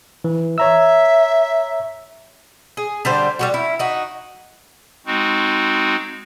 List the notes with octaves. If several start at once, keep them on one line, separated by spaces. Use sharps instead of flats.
E3
C#5 E5 A#5 E6
G#4
D3 G3 C5
G3 G#3 F#4
E4
D#4 F#4
G#3 C4 D#4 F#4